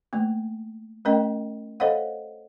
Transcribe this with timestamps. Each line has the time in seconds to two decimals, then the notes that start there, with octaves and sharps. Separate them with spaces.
0.13 A3 A#3
1.05 A3 C#4 A#4 D#5 G5
1.80 A4 C5 C#5 D#5 F5 F#5